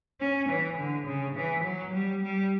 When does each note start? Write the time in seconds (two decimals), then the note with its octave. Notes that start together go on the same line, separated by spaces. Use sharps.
0.21 C#4
0.49 E3
0.78 D3
1.07 C#3
1.36 E3
1.65 F#3
1.93 G3
2.22 G3